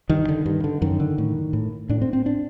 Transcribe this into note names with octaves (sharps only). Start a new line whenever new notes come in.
G2 D#3
D3
G2
D3
F#2 D#3
D3
A2
A2
A2 D4
C4
C4
D4